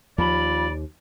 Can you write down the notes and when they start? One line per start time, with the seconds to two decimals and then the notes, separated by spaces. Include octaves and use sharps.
0.18 D#2 F3 D5 B5